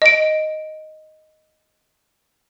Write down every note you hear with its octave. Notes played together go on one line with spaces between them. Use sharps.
D#5 D7